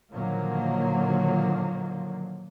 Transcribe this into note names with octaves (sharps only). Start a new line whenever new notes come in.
A#2 D3 D#3 F3 F#3 A#3